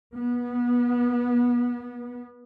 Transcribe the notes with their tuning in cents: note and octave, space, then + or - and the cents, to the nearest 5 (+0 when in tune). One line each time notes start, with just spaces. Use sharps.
B3 -25